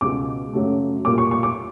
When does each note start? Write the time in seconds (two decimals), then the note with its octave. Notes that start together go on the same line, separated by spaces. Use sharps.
0.01 C#2 B2 G#3 D6
0.54 F#2 C#3 F#3 A3
1.05 A#2 G3 A#3 D6
1.18 C#6
1.31 C#6
1.43 D6